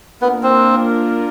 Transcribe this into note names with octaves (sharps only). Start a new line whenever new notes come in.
A#3 B3 D4 F4 A#4
C4